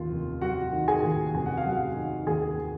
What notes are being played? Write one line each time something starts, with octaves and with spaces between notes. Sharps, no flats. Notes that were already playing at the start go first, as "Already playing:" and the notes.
Already playing: D#2 D#3 F4
F1
F#3 F#4 F#5
D#3
G#4 G#5
D#2
F1 G#5
F#5
F5
F#3 F#4 F#5
D#3
D#2 G#4 G#5